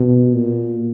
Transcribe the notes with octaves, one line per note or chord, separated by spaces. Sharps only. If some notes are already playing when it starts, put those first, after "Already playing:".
Already playing: B2
A#2